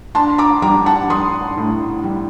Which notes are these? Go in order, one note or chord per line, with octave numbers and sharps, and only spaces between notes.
D4 A5 C6
A#5 D6
G3 A#5 D6
F#5 A5
G3 C6 D#6
A2
G3